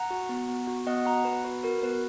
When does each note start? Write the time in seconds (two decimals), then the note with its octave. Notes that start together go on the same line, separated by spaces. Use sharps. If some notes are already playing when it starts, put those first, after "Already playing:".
Already playing: F#5 A#5
0.11 F#4
0.29 B3
0.49 B3
0.68 F#4
0.87 B3 D#5 F#5
1.05 F#4 F#5 A#5
1.25 B3 B4
1.44 F#4 B4
1.63 F#4 A#4
1.83 B3 B4